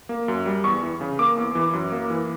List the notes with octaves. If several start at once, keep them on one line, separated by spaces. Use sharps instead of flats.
A#3
F#2
G3
E2 C#6
E3
C#3
A#3 D6
E2
E3
F#2
A#3
E3